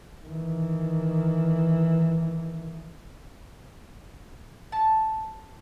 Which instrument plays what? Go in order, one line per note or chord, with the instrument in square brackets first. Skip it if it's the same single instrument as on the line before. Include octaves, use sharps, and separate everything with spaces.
[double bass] D#3 E3
[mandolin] A5